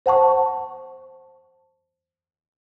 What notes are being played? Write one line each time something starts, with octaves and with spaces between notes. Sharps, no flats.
C5 F#5 A5 C#6